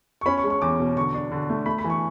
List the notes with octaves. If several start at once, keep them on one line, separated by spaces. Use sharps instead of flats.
C#6
C#4 B5
C#6
G#3
C#6
E2 D6
B2
D3 C#6
D4
D3
A3
A3 B5
B5
E3
C#6